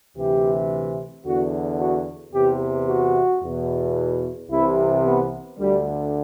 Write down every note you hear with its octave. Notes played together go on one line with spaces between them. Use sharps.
D2 C3 E3 G4
E2 D3 F#4
F#4
E2 C3 E3 G4
F#4
E2 B2
C2 C3 E3 E4
B3
D2 D3 G3